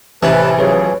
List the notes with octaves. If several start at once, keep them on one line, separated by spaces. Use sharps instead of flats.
A1 C3 E3 B4 G#5 A5 B5
F3 F#3 G#4 B4 C#5